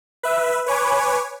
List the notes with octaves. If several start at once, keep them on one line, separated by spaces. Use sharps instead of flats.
B4 E5
B4 C#5 G#5 D6